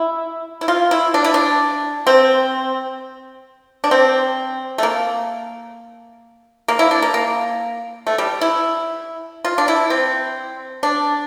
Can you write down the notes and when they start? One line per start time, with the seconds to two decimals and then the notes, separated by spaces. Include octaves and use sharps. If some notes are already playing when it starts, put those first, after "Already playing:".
Already playing: E4
0.61 E4
0.68 F4
0.91 E4
1.14 D4
1.24 E4
1.34 D4
2.07 C4
3.84 D4
3.91 C4
4.78 A3
4.83 A#3
6.68 A#3
6.79 E4
6.91 D4
7.02 A#3
7.14 A#3
8.07 A3
8.18 G3
8.41 E4
9.45 F4
9.58 D4
9.68 E4
9.90 C4
10.83 D4